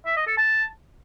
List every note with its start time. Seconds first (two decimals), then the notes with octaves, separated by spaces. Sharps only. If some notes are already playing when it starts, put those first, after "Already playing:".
0.06 E5
0.17 D#5
0.27 A4
0.37 A5